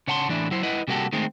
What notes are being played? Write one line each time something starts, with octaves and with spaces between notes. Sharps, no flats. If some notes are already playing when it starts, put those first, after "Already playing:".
C#3 C#5 F#5 A5 A#5 C6
A2 E3 D4 E4
F#3 E4 C5
E4 B4 D#5 F#5
C3 G3 A#3 F#4 G4 A4
D#3 G#3 A3 C4